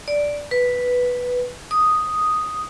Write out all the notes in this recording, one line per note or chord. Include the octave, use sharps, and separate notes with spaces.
D5
B4
D#6